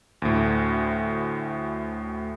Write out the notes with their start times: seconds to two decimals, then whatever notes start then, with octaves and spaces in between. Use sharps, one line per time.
0.22 D2 A2